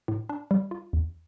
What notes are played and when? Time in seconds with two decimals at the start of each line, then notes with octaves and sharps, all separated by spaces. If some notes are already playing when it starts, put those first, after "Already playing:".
0.08 A2
0.29 D4
0.51 G3
0.71 F4
0.93 E2